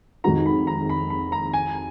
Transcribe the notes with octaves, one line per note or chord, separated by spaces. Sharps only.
F2 D#3 G#3 D#4 F#4 A#5
B5
A#5
B5
B5
A#5
G#5